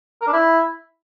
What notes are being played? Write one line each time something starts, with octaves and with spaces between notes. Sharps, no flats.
A#4
D4
E4